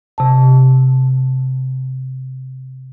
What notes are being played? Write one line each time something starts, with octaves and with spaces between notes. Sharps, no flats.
C3 A5